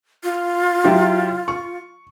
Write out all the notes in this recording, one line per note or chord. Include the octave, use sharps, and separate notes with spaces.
F4
F#3 E4 G4
C#6